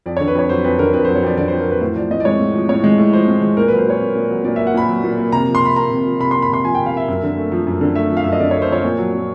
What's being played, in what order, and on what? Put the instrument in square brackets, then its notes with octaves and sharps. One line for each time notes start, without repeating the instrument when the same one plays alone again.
[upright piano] F2 D5
D3 C#5
B4
F2 C#5
F#3 C5
F2 B4
D3 A#4
F2 B4
F#3 C5
C#5
F2 D5
D3 D5
F2 C5
A#4
F#3 B4
A2 C5
F3 D5
A2 D#5
D5
G#3 C#5
A2
F3
A2 C#5
G#3
A2
F3 C5
A2
G#3
A#2 A#4
F#3 B4
C5
A#2 C#5
A#3
A#2
F#3
A#2 D5
A#3 E5
F#5
A#2 B5
F#3
A#2
A#3
C3 A#5
F3
C6
C3 B5
A#3 A#5
C3
F3
C3 B5
A#3 C6
B5
C3 C6
F3 G#5
C3 G5
F5
A#3 E5
F#2
D3
A3
F3
F#2
D3
A3 E5
F3
F5
F#2 E5
D#5
D3 D5
A3 C#5
C5
F3 C#5
A#2
F#3
A#2